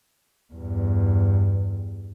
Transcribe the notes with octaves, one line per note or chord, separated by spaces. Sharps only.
E2 G2